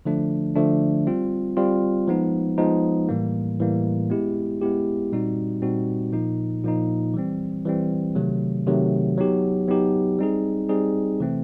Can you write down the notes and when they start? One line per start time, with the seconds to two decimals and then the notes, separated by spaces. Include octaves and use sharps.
0.05 D3 F3 A3 D4
0.56 D3 F3 A3 D4
1.07 G3 C4 F4
1.57 G3 C4 F4
2.07 F3 G#3 B3 D#4
2.58 F3 G#3 B3 D#4
3.09 A2 E3 G3 A#3
3.59 A2 E3 G3 A#3
4.10 G#3 B3 E4 G4
4.62 G#3 B3 E4 G4
5.12 A#2 G3 C4 D#4 F#4
5.62 A#2 G3 C4 D#4 F#4
6.13 A#2 F3 A#3 D#4
6.64 A#2 F3 A#3 D#4
7.14 E3 G3 C4
7.65 E3 G3 C4
8.15 C3 D#3 F#3 A3
8.66 C3 D#3 F#3 A3
9.17 F#3 B3 D#4 G4
9.68 F#3 B3 D#4 G4
10.19 G3 C4 D#4 G#4
10.69 G3 C4 D#4 G#4
11.20 C3 E3 A3 C4